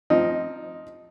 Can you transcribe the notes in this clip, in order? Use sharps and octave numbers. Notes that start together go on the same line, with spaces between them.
F3 C4 D#4